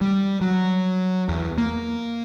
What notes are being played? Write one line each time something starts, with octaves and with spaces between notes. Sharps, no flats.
G3
F#3
E2
A#3